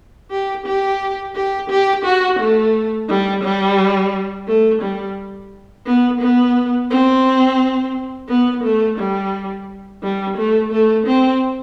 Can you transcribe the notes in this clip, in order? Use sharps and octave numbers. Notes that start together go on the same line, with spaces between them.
G4
G4
G4
G4
F#4
A3
G3
G3
A3
G3
B3
B3
C4
B3
A3
G3
G3
A3
A3
C4